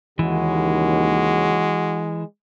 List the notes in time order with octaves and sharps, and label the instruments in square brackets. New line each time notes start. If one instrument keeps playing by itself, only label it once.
[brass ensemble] D#2 C#3 [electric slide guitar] E3 [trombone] G#3 [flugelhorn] F#4